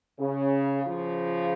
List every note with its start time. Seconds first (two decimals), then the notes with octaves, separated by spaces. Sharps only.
0.20 C#3
0.85 C#3 F3